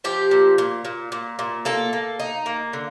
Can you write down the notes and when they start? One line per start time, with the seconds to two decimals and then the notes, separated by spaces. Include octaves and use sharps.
0.04 F3 G4
0.31 A#2
0.58 A#2
0.85 A#2
1.12 A#2
1.39 A#2
1.65 A#3 A4
1.93 A#3
2.19 D#4
2.46 A#3
2.73 D3